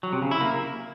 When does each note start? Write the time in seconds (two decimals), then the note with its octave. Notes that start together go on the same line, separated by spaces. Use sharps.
0.03 F#3
0.13 C3
0.22 C#3
0.31 E4
0.41 A#3